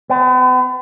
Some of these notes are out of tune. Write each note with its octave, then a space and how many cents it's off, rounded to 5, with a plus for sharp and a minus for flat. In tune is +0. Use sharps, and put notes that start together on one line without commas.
B3 +45